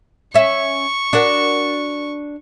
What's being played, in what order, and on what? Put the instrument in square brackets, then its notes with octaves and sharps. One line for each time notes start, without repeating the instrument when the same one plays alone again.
[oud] C#4 E5 [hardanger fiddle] C#6
[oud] D4 F#4 A#4